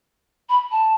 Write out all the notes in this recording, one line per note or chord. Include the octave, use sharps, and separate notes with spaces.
B5
A5